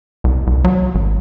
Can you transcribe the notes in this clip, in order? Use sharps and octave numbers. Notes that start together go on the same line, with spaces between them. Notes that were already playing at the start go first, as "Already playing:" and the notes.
C2
C2
F#3
G#1